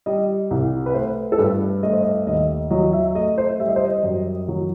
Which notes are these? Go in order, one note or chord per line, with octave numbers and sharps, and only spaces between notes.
G3 D#5
C2
B4
A3 C5
A4
G2 B4
A3 D#5
C5
D#5
D#2 D#5
F#3 D#5
E5
A3 D#5
C5
G3 E5
D#5
C5
D#5
F#2
F#3